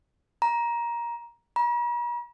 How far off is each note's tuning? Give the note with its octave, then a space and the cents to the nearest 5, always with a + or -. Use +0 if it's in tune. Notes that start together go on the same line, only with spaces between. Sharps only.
A#5 +15
A#5 +45